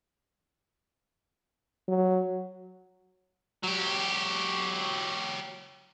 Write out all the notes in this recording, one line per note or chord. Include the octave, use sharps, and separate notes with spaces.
F#3
F#3 G4